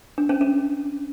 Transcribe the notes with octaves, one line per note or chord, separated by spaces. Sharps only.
D4
C#4
C#4